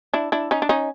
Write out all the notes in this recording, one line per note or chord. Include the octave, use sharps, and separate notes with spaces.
D4 E4
D4 E4
C#4 D#4
D4
C#4 D#4